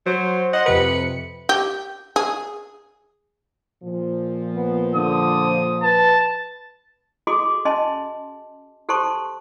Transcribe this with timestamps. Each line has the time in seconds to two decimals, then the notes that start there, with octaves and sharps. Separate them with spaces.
0.06 F#3 C5
0.53 C5 D#5 F#5
0.66 F2 C3 B4 C#7
1.49 G4
2.16 G#4
3.83 A#2 F3
4.55 B3
4.95 D3 D#6
5.83 B4 A5
7.27 F#4 G#4 A4 D#5 C6 D6
7.65 C#4 D#5 G#5 A5 C6
8.89 G4 A4 C5 A5 C6 C#6